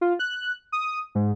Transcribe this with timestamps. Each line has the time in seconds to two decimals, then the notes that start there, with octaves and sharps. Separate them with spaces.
0.01 F4
0.19 F#6
0.72 D#6
1.15 G#2